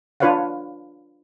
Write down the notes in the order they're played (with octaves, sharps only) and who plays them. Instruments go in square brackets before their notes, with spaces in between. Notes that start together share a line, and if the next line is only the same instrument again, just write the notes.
[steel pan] D4 F4 B4 C#5 F5 F#5